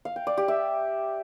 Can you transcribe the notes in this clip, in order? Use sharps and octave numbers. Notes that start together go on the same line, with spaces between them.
F5
G5
D5
G4
E5